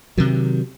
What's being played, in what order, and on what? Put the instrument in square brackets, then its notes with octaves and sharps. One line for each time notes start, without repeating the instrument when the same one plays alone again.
[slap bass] C3 D#3 F#3